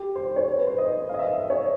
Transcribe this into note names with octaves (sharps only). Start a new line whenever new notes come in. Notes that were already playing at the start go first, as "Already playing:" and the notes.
Already playing: G4
C5
C5
C#5
B4
C5
D#5
D#5 F5
E5
C#5